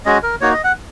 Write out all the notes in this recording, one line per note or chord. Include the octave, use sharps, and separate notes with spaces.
G#3 C#4 F#4 D#5
A#4
A#3 D#4 F#4 C#5
D#5
F#5